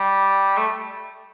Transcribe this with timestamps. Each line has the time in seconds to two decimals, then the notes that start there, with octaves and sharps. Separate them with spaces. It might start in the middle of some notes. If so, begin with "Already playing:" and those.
Already playing: G3
0.57 A3